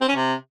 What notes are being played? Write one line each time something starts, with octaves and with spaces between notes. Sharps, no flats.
C4
C#4
C3